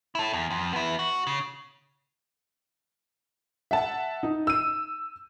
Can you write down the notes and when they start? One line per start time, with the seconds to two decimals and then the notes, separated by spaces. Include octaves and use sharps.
0.15 E4 A4
0.33 E2
0.51 F2
0.73 B3 E4
0.99 F#4
1.27 C#3
3.71 E5 F#5 A5
4.23 D#4
4.47 E6 D#7